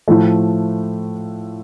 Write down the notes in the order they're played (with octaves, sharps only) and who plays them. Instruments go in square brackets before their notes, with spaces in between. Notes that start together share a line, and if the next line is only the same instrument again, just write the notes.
[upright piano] A2 F3 A3